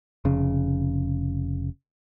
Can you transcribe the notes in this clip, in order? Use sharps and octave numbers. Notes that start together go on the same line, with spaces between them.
F1 C#3